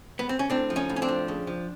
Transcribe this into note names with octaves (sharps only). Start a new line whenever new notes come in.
B3
C4
C#4
A2 C4 D4
F3
C#4 D#4
A2
C#4
C4 D4
F3
C#3
F3